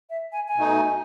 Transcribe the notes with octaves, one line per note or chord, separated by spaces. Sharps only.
E5
G#5
G#5
B2 A3 D#4